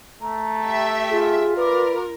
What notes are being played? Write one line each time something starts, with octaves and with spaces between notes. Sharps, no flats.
A3 A5 A#5
G4 E5
F4 G#4
A#4 B4 D5 B5 D6